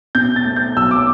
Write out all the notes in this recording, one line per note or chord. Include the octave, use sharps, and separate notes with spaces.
B2 G6
A6
A3
G6
B1 E6
D6